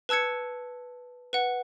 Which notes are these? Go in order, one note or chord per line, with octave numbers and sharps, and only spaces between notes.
B4 A5 E6 G#6 C#7
B4 F#5